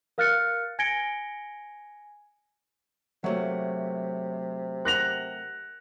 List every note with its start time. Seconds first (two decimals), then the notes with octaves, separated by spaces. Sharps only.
0.18 A#4 F5 F6 F#6 A6 C#7
0.79 G#5 G#6 A#6 C#7 D7 G7
3.24 C3 F#3 A3 A#3 C#5 E5 F#5
4.85 A#4 F#5 F#6 A#6 F7